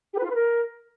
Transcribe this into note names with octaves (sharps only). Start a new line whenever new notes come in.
G4
B4
F4
B4
A#4